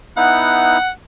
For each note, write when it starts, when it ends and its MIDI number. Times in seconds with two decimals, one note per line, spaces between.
0.17 0.78 59
0.17 0.78 63
0.17 0.78 64
0.17 0.89 78